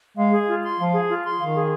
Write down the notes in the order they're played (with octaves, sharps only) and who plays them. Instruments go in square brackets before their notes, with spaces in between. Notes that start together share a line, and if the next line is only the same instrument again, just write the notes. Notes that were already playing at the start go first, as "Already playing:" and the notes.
[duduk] G#3 [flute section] F5
[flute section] G#4
F4
C6
[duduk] F3 [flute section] F5
[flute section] G#4
F4
C6
[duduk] D#3 [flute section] F5
[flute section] G#4